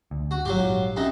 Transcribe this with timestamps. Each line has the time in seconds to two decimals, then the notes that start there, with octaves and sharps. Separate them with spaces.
0.11 D2
0.31 F#4
0.45 G#1 F#3 F4 G4
0.58 A#1 G#2
0.96 F#2 C3 D#4